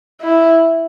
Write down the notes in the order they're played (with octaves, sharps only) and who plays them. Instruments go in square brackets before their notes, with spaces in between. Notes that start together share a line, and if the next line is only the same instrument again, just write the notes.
[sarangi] E4